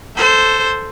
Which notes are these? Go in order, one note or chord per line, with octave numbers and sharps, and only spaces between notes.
A4 C5